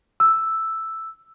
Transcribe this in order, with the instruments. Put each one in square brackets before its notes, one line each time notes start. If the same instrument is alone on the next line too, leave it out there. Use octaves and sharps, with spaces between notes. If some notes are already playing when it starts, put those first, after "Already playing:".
[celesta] E6